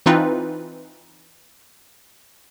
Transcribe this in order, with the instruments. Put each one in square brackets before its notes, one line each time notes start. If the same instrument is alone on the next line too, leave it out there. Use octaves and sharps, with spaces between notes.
[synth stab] E3 C4 D#4 F4 B4